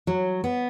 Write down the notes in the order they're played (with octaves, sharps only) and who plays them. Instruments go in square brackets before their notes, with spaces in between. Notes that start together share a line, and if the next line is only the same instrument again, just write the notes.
[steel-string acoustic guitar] F#3
B3